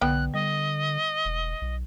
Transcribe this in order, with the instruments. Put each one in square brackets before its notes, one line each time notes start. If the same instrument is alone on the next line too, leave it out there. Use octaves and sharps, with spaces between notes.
[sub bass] B1 [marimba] D3 [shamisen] B3 G5 [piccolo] F#6
[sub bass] D3 [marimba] G3 [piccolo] D#5
[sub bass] E1
B1